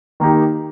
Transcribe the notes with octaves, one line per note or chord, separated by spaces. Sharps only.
D#3 A#3 D#4 G4